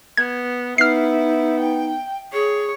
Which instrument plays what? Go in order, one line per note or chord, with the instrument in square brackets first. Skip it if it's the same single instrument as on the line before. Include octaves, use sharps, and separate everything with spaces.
[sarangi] B3 [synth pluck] G#6
[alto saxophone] B3 [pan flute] D#4 [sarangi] E4 [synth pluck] F6 C7
[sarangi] G5
[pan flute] G#4 [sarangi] C#5